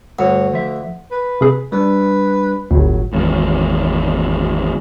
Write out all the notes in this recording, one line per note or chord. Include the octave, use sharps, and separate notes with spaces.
D2 G2 C#5 F#5
F3 E5
B4
C3 G#4
G3 D4 B4
G1 D2 A2 F#3
G#1 E2 G#2